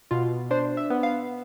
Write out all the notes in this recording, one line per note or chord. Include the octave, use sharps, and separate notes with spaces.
B2 F4
D4 C5
E5
B3
F5